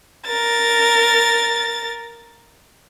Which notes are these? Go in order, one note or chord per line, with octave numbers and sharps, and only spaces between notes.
A#4 A6